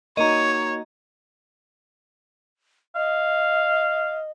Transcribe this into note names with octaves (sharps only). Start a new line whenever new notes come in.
A#3 D#4 F#4 C#5 D#5 A#5
D#5 F5